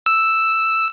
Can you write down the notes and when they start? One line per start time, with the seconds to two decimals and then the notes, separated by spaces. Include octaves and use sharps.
0.06 E6